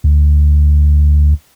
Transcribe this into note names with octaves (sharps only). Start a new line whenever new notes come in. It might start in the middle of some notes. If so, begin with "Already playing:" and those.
D2